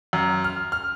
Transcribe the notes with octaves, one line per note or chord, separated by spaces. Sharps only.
F#2
F6
F6